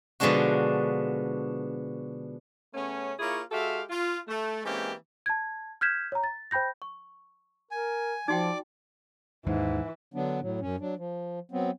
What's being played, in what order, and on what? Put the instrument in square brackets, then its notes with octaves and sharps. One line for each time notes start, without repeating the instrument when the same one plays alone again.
[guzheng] B2 D3 F3 G#3 D4 F#4
[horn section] C#3 A3 B3 C#4
A#3 E4 F4 G#4 C#5
G#3 F#4 G4 A4 E5 F5
F4
A3
E3 G#3 A#3 C4 C#4 G4
[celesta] A5 G#6
F6 G6 G#6 B6 E7
C#5 A#5
A6
C5 G5 B5 G6 A#6
[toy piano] C#6
[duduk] A#4 [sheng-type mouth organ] G#5
[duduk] F3 [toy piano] D#4 F#4 G5 [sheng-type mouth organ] D5 D6
[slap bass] D#2 G#3 [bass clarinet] G#2 [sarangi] E3
[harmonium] D3 F#3 B3 D4
A2 F#3
F#2 C#4
F#3 D4
F3
F#3 B3 C4